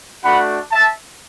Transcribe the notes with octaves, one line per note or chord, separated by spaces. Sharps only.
A3 D4 F#4 F#5 B5
E5 A5